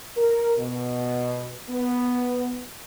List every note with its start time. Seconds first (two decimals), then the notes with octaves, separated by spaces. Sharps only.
0.17 A#4
0.58 B2
1.70 B3